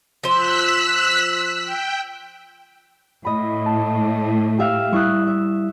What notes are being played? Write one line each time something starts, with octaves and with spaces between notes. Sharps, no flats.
F3 C5 E6 F#6 B6
G5
A2 D#5 B5
A5
G4 E5 F5
G3 E4 C#6 D#6 F#6
E5